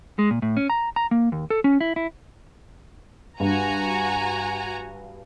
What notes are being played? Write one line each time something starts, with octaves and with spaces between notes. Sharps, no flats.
G#3
A#2
A2
C#4
A#5
A#5
A#3
D#2
A4
C#4
E4
E4
G2 F#4 G#5 A#5